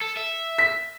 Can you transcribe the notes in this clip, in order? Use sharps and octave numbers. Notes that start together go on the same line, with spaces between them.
A4
E5
B6